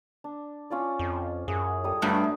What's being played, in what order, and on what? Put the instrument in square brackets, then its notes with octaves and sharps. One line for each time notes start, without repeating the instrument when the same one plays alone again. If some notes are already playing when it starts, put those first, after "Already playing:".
[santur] D4
C#4 F4 D5
[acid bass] F2
[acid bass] F#2 [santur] G#4
[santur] G3 A4 D#6
[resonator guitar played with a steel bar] G2 [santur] F#3 [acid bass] A3